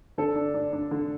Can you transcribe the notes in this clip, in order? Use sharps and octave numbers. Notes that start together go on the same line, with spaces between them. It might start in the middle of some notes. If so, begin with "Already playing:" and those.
D3 A4
D4
D4
D4
D3